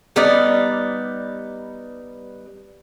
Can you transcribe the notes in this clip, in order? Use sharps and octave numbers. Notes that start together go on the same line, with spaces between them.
G3 B3 D#4 D5